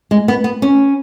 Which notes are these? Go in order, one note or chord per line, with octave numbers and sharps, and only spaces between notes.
G#3
B3
B3
C#4